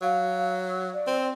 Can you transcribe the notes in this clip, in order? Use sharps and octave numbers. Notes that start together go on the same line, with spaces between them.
F#3 F5
D5
C4